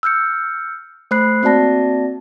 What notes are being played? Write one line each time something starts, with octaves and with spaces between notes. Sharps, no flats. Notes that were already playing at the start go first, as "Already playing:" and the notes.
E6 F6 G6 C#7
A3 C5 B5 F#6 C7
A#3 C4 F#4 D5 A5 A#6